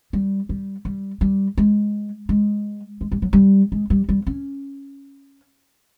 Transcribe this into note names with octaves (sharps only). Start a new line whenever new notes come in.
G3
G3
G3
G3
G#3
G#3
G#3
G3
F#3
G3
G#3
G3
G3
C#4